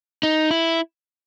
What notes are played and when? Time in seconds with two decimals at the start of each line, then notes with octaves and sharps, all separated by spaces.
0.23 D#4
0.51 E4